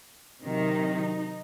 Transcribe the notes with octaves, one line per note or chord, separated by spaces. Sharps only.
C3 D#3 F#3 D#4